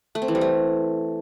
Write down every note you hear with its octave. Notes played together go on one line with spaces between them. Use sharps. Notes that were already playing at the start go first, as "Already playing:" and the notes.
A3
C4
E3
G3
A3